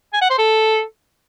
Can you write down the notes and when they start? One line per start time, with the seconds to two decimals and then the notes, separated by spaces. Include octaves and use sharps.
0.13 G#5
0.22 F#5
0.30 C5
0.38 A4